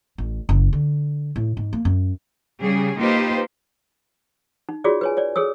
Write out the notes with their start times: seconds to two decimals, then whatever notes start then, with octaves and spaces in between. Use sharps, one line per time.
0.18 A1
0.49 F#1
0.73 D3
1.36 A2
1.57 G#2
1.73 A#3
1.85 F#2
2.61 C#3 G3 G#4
2.98 A#3 D#4 F4 G4 B4 C5
4.69 D#4
4.84 F4 F#4 G#4 C#5 D5
5.01 B4 C#5 G#5
5.17 C#5 D5
5.36 G#4 A4 C#5 E6